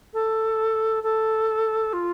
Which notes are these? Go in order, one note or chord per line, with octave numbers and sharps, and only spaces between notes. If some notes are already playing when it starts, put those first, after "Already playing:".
A4
A4
F4